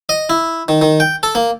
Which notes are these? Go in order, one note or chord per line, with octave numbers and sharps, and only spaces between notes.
D#5
E4
D#3
D#3
G5
A4
A#3